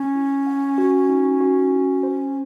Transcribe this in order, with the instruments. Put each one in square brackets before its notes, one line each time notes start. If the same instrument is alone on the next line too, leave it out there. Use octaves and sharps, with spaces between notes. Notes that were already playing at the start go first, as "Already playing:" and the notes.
Already playing: [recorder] C#4
[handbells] E4
F#5
F#4
D#4
F#4
E4
C5